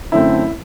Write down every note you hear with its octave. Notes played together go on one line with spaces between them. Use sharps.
F#2 D3 A3 C4 E4